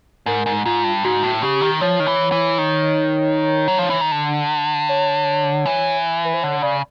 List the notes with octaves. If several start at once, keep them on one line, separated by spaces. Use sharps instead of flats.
G#2 A#4
G#2
G#2 F4
G2
G#2 F#4
A2
C#3 G4
D#3
F3 C#5
D#3
E3
E3
D#3
F#3
F3
E3
D#3
D3
C#5
E3
B4
C5
D3 C#5
C#3 D5